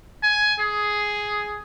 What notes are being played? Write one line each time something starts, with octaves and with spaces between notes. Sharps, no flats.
G#5
G#4